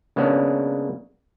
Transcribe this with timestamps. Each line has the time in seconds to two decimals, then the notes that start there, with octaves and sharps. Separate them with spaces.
0.16 C#3 G#3 A#3 B3 C#4 D4